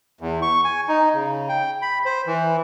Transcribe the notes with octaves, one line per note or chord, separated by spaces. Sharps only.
E2
C#6
G#5
D#4
C#3
G5
B5
C5
E3